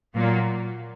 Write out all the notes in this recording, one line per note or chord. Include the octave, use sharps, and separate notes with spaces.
A#2 F#3 A#3